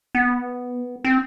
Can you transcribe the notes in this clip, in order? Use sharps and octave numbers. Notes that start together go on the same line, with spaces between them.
B3
C4